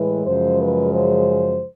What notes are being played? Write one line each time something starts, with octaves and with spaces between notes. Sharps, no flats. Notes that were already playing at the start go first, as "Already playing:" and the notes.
Already playing: A2 E3 G#3 B4
F#2 C#3 F3 G#3 C5
B4
C5